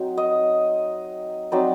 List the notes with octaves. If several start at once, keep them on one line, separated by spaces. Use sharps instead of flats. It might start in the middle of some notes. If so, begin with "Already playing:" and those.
Already playing: F#3 C4 D#4
D#5
F#3 C4 D#4 D5